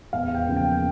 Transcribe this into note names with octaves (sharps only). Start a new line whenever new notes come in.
E2 F5
G5
C#3 F3 A#3
G5